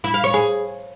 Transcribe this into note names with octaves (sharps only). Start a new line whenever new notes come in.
E4
F5
C#5
G#4